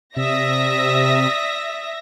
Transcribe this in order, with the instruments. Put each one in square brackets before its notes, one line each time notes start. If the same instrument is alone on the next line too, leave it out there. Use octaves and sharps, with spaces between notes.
[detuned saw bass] C3 [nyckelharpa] D5 D#6 [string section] E5 A#6